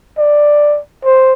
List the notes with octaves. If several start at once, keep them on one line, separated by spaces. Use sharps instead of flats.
D5
C5